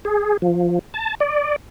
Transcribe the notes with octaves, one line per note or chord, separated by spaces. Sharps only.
G#4
F3
A5
D5